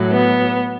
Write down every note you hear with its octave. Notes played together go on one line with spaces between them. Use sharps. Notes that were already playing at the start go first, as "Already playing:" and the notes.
Already playing: A2 F#3
B3